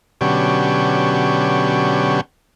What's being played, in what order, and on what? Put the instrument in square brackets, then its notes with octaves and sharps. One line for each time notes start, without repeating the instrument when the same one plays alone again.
[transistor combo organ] B2 D3 F#3 C#4 G4